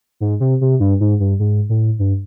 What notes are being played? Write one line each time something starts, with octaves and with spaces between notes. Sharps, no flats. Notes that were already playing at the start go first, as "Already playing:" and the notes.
G#2
C3
C3
G2
G#2
G2
G#2
A2
G2